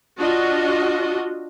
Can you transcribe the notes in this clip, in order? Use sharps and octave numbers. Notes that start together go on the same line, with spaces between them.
D4 F4 F#4 D#5